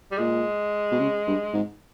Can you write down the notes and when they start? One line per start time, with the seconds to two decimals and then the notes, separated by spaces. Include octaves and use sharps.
0.12 G3
0.18 A#2 G#3
0.91 B2
0.99 C#3
1.27 G2
1.53 G#2